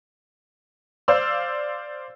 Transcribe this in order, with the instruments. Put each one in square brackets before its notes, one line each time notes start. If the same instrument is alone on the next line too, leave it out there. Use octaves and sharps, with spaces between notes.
[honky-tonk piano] C5 D5 F5 E6